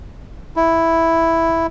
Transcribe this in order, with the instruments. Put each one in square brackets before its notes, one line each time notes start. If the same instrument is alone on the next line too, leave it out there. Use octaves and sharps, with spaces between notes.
[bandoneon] E4